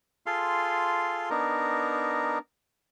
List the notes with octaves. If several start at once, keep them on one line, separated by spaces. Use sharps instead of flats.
F4 G#4 A4 F5 C6
B3 D4 D#4 A#4